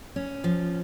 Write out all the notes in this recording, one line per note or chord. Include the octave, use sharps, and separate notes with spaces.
C#4
F3